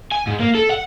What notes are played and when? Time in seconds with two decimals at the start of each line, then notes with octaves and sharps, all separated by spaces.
0.12 G#5
0.27 G#2
0.40 A#3
0.55 A4
0.70 F#5